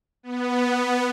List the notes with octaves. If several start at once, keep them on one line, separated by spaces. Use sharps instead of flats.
B3